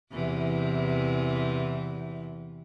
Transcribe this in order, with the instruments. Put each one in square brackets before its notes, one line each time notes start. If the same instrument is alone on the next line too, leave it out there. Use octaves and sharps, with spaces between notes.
[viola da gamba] E2 C3 E3